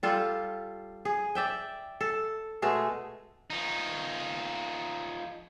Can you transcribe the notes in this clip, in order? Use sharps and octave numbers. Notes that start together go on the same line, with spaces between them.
G3 F4 A4
G#4
D5 E5 G5
A4
B2 G#3 A3 G#4
F3 D#4